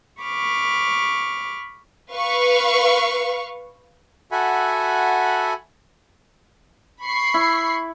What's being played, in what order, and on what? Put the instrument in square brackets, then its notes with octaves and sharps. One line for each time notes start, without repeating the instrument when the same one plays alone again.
[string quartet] B5 C#6 D6 F6
[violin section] B4 F5 C#6
[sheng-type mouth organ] F#4 A4 E5 F#5 G#5 B5
[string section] B5 C#6 C7
[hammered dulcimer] E4